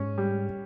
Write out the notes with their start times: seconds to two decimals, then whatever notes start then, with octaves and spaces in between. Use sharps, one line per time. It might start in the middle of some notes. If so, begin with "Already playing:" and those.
Already playing: G#2 C#4
0.18 G3